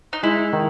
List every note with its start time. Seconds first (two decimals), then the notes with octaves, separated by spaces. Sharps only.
0.13 D#4
0.23 G#3 E4
0.53 D#3